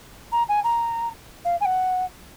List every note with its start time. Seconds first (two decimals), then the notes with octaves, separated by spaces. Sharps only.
0.32 A#5
0.49 G#5
0.64 A#5
1.45 F5
1.61 G#5
1.65 F#5